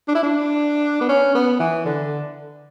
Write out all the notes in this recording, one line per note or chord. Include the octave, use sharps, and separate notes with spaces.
D4
E4
D4
B3
C#4
B3
E3
D3